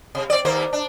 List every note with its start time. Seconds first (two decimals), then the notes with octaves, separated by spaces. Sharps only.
0.15 C3
0.30 C4 D5
0.45 D#2 A#3 C5
0.73 D4